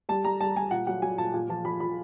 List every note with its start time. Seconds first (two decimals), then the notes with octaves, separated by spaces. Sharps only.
0.09 G3 A5
0.25 G3 A#5
0.41 G3 A5
0.56 G3 G#5
0.71 A#2 F#5
0.87 F#3 F#5
1.02 F#3 G#5
1.18 A#2 A5
1.34 A#2 G#5
1.49 F3 A5
1.65 F3 B5
1.80 F3 B5